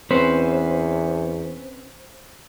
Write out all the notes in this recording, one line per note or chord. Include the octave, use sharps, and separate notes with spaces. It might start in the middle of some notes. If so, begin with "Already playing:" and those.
E2 C4 C#4 B4 C5